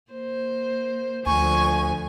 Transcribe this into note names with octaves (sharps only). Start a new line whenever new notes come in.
A#3 C5
D2 D3 F3 G#5 C#6